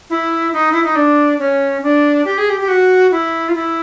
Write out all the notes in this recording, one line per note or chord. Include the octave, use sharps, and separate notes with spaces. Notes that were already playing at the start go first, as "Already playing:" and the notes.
E4
D#4
E4
D#4
D4
C#4
D4
G4
G#4
G4
G4
F#4
E4
F4
E4